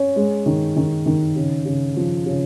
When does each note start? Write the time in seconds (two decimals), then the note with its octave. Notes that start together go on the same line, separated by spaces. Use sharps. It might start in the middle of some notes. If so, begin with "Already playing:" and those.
Already playing: C#4
0.16 G#3
0.46 D#3
0.76 D#3
1.06 D#3
1.36 C#3
1.65 C#3
1.97 F3
2.26 C#3